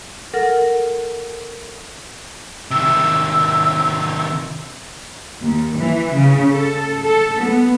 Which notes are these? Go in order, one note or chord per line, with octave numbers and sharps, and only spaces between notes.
A4 A#4 F#5 F6
C3 D#3 E6
D#2
E3
C#3
A4
A4
B3